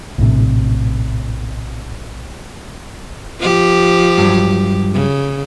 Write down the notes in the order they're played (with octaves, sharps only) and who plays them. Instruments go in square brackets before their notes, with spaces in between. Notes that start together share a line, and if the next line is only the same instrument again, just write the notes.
[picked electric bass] A#1 A2 C3
[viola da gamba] F3 G4
[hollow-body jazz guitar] G2 F#3
[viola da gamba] C#3